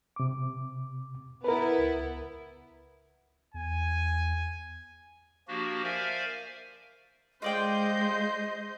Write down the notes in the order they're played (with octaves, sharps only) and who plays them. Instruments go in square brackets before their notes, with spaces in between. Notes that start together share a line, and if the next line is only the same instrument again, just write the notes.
[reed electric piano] C3 D6
[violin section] B3 E4 [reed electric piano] A#4 B4
[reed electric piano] C#2
[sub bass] E2 [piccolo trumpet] G#5
[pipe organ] F3 A#3 D4 F#4 G4
A#4 C5 D5 E5 F5 G#5
[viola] G#3 [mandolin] F4 D5 G5 [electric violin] C5 G6 [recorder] D#5